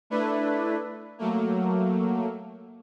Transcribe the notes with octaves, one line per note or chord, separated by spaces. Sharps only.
A3 D4 E4 B4
F#3 A3 A#3